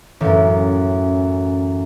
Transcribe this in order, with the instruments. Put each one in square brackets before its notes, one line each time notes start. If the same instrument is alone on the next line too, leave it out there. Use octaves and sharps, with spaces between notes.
[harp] A1 F#2